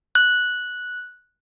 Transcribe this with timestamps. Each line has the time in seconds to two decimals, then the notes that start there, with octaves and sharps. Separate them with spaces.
0.15 F#6